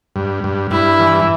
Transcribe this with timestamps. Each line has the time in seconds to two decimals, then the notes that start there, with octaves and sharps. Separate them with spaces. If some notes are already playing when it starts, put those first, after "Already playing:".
0.16 G2
0.44 G2
0.71 G2 E4
1.00 E3